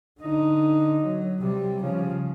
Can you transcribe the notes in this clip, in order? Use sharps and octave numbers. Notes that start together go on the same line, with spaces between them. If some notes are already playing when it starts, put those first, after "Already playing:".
D3 D#4
F#3
C3 G3
C#3 F3